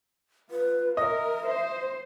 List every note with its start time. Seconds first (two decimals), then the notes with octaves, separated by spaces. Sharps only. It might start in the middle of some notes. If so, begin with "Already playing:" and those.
0.51 F4 B4
0.97 A#4 D#5 E5
1.46 C5